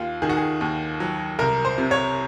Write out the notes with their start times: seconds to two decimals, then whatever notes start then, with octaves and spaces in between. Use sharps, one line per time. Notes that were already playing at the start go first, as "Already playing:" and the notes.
Already playing: D#2 F4
0.22 D#3 G#4
0.29 F#4
0.37 G#4
0.61 D#2
1.00 F#3
1.39 C2 A#4
1.65 C5
1.78 C3
1.91 C#5